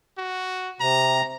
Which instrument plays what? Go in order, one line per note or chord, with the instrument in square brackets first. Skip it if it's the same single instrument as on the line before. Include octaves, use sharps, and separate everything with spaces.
[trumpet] F#4
[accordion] C3 [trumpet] A#5